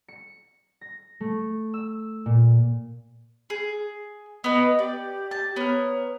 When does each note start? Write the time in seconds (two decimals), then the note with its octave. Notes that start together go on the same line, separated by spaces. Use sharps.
0.08 C#7
0.81 A#6
1.20 A3
1.74 E6
2.26 A#2
3.50 G#4
4.44 B3 B4 D#5
4.79 G4 D5
5.31 A5
5.56 B3 A#4 C#5